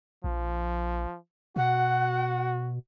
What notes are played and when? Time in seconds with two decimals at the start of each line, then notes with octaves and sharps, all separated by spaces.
0.24 A#1 F3
1.56 B2 F#4 F#5